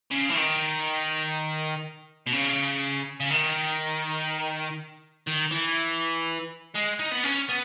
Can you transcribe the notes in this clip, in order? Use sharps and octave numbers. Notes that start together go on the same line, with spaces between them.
C#3
E3
D#3
B2
C#3
C#3
D#3
D#3
E3
G#3
D#4
B3
C#4
B3